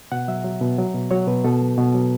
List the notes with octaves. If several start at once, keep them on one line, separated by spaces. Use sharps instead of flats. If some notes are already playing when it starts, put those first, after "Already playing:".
B2 F#5
F#3 E5
F#3
B2
F#3
B2
F#3 C#5
B2 B4
B2 A4
F#3
B2
F#3